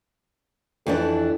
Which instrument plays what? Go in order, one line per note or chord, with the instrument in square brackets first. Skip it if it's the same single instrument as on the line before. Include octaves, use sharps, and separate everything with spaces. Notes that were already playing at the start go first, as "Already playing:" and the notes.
[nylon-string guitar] F2 E3 D4 [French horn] A4